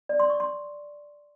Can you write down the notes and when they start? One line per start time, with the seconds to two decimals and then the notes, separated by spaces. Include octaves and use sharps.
0.09 D5
0.20 C6
0.30 C#6
0.40 C6